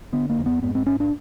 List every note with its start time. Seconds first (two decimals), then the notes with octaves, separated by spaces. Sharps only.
0.13 D3 B3
0.30 A#3
0.38 F2
0.46 B3
0.62 G#2 B3
0.75 C4
0.86 G#2 C#4
1.00 D4